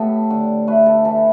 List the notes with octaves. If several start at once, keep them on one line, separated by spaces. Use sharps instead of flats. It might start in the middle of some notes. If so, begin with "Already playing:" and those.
Already playing: A2 B3 G4 A4
D3
A3 B4
A4
E3 A4